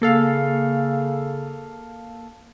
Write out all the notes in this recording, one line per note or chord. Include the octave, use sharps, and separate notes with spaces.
C#3 A#3 A4 F5